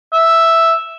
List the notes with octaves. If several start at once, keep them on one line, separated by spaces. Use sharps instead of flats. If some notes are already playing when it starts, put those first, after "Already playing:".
E5